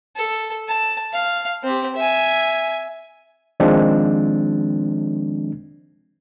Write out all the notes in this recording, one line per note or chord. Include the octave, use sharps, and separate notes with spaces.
A4
A5
F5
C4 G4
E5 G#5
D#3 F3 G#3 C4 D4